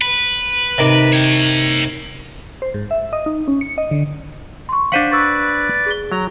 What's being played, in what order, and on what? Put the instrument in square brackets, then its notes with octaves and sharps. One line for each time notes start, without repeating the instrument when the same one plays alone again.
[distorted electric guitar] B4
[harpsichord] C3 D#3 D6
[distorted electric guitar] C#5 G5
[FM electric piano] C5
G#2
E5
D#5
D#4
C#4
C#7
D#5
D3
[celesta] C6 C#6
[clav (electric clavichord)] D4 C5 F#5 [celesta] F5 B6 D#7
[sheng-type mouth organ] B4 D5 [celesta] C#6 E6
[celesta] G#4 G7
[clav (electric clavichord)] F#3 [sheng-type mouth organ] A#5